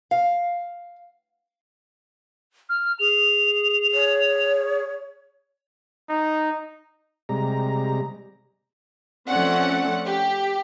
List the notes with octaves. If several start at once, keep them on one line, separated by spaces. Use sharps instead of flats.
F5
F6
G#4 F7
C#5
D#4
C3 G3 G#3 A#5
F3 A3 C4 C#4 D5 F#5
G4